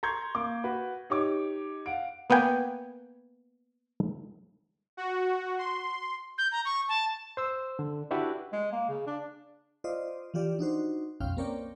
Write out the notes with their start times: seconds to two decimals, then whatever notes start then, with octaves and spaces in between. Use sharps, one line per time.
0.03 A#5 C6 C#6 G6 G#6
0.35 A#3 D6
0.64 F#4 B4
1.10 D#4 G4 C#5 D6
1.86 F5 F#5 D7
2.30 A#3 B3 B4 G5 G#5
4.97 F#4
5.58 C6
6.38 G6
6.52 A#5
6.65 C#6
6.89 A5
7.37 C5 E6
7.79 D3
8.11 D4 E4 F#4 G4 B4 D5
8.52 G#3
8.72 A#3
8.89 C#3
9.07 D4
9.84 F4 C5 D5 D#5
10.34 E3 F3 F4 G4 D5
10.59 D4 D#4 F#4 C5
11.20 B1 F2 C#4 F5 G5 F6
11.37 A#3 C4 A#4 C#5 D5 G5